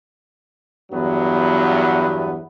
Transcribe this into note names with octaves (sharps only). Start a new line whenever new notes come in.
E2 G2 F#3 B3